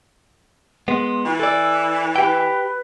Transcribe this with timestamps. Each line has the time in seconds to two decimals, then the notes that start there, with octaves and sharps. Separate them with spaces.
0.88 G#3 B3 C6
1.25 E3 F4
1.39 A4 D5 E6
2.16 G4 B4 G5